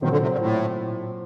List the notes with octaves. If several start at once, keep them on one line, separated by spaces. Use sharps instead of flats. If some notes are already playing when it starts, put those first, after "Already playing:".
A#2 D#3 F#3 C4
D3
C3
A#2
A2